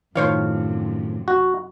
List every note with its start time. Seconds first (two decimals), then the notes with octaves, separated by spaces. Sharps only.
0.15 F#2 A2 C3 D#3 F3 C5 C#5 F5
1.28 F#4